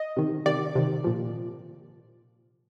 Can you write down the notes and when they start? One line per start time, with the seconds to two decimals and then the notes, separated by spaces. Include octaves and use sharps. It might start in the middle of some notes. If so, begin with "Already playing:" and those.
Already playing: D#5
0.17 C3 D#3
0.46 C3 D#3 D5
0.75 C3 D#3
1.04 A#2 F3